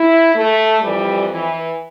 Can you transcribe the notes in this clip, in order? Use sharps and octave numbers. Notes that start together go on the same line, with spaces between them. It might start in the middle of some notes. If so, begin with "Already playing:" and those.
Already playing: E4
A3
F2 E3 G3
E3